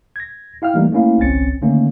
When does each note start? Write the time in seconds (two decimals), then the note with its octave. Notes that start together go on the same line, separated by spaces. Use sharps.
0.16 G#6 A#6
0.62 E4 F5 G5 F6
0.74 E3 G3 A3 A#3 D#4
0.92 A3 A#3 C#4 E4 F5
1.18 G1 C2 C4 C#4 A6 C#7
1.62 D3 D#3 A3 A#3 C#4